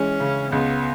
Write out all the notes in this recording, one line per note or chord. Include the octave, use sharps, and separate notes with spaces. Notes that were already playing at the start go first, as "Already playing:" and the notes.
Already playing: E3 G#3 C#4
C#3
C#2 B3